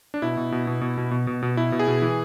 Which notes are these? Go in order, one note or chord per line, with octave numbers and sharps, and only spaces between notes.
D4
B2 E4
B2
B2
B2
B2
B2
B2
B2
B2
B2 E4
B2
G#4
B2
E3